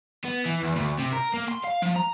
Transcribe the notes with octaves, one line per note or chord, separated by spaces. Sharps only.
B3
E3
E2
D2
C3
A#4
A#3
C6
F5
F3
A#5